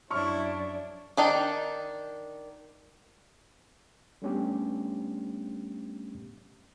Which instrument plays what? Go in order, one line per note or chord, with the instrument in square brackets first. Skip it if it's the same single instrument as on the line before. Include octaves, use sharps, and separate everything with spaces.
[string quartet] F#2 D4 [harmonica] E4 C#5 [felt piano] C#6 F6
[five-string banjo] D#3 D4 D#4
[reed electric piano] G3 A3 B3 C#4 D4 G4